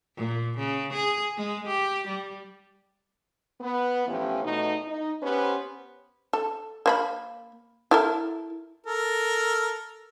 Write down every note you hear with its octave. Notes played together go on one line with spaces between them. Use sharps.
A#2
C#3
G#4
G#3
G4
G3
B3
A2 E3 F3 C#4 E4 G4
E2 B2 A3 D#4
D#4
B3 C#4 G4 B4 C5
A4
A#3 C5 B5
E4 A4 A#4
A4 A#4